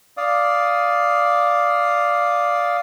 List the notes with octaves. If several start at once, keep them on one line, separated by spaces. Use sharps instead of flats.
D5 F5 D#6